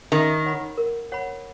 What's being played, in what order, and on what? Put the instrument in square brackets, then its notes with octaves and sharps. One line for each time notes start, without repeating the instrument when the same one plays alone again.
[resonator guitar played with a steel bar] D#3 [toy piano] A#4
[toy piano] C#5 F#5 B5
A#4
C#5 F#5 B5